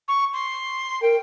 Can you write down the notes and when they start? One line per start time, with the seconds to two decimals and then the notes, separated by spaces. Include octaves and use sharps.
0.08 C#6
0.33 C6
1.02 A#4 G5